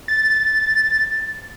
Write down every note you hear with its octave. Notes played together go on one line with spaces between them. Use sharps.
A6